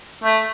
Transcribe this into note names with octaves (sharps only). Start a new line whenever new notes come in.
A3